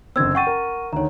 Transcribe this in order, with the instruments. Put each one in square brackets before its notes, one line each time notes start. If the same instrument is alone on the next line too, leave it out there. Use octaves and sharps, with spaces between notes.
[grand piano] F#1 D3 C4 [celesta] E6 G#6
[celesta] F#5 C#6 D#7 [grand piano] G5 A6
[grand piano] A#4
[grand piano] D2 D#3 [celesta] C#5 A#5